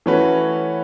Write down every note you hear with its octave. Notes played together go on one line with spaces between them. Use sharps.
E3 A3 C#4 F#4 B4